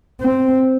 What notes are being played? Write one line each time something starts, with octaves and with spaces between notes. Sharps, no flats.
C4